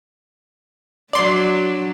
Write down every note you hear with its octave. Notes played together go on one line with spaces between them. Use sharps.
F#3 D4 D5 C6